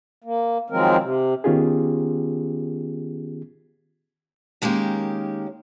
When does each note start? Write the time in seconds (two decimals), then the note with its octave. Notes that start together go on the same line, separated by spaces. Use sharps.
0.24 A#3
0.70 D#3 F3 F#3 G#3 C4 A#4
1.00 C3
1.44 D#3 B3 C#4 F4 G4 G#4
4.62 D#3 G#3 A#3 C#4 G4